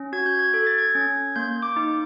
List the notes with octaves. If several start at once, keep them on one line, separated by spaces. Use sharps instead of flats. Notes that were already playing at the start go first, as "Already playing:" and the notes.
Already playing: C#4
F#4 G#6
G6
G#6
A4 G#6
A6
G#6
C#4
A#3 G6
D6
D#4